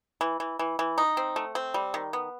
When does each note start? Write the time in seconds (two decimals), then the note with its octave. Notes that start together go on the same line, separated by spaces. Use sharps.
0.21 E3
0.40 E3
0.59 E3
0.79 E3
0.98 D#4
1.17 C4
1.36 A3
1.55 C4
1.74 G3
1.94 D#3
2.13 B3